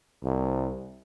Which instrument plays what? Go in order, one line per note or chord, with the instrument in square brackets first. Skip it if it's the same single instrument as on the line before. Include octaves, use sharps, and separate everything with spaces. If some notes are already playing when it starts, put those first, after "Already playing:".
[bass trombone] C2